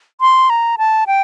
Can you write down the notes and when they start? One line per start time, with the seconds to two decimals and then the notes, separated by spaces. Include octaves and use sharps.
0.21 C6
0.50 A#5
0.78 A5
1.07 G5